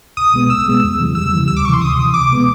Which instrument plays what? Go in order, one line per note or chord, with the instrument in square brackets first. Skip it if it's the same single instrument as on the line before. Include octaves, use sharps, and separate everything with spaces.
[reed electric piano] C2 [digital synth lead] D#6
[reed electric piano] B2 G#3 B3
[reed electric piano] C2 [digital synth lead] E6
[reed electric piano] B2 G#3 B3
E2
C#3 E3 G3
[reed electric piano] E2 [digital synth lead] E6
[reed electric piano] C#3 E3 G3
[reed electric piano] D2 [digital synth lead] E6
[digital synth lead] D6
[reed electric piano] C3 [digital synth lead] C#6
[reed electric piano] E3 [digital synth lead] C6
[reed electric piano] D2 [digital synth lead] D#6
[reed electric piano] C3 E3
[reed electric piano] C#2 [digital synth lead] D6
[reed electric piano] B2 G#3 B3